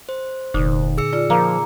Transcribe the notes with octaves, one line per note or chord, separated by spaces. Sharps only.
C5
F1 A#2 D3 D#4
G#4 E6 C#7
F4 D5
F3 A#3